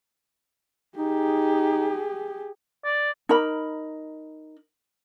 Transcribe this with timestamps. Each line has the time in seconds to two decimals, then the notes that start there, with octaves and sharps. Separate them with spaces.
0.97 D#4 G4 G#4
2.85 D5
3.29 D#4 A#4 B5